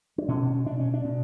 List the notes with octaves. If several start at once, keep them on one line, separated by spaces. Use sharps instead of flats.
D4
B2 C#4
B2 D4
C#4
D4
B2